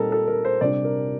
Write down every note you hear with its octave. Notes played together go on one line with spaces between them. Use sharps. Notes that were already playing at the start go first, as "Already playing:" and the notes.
Already playing: A#2 G3 C4 D#4 A4 A#4
A4
A#4
C5
C3 G3 D4 D5
A#4